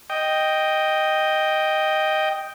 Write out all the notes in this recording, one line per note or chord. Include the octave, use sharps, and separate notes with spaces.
D#5 G5